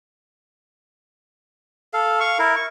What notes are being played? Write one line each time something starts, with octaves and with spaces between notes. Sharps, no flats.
A4 F5
F5 C#6
E4 A#4
C#6